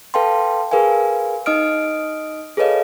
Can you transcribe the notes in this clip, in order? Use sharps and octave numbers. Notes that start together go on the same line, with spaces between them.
A4 B4 F5 G5 A5 C6
G#4 A#4 B4 F5 G#5
D#4 D#5 D#6 F6 D7
G#4 A4 B4 C#5 D#5 F5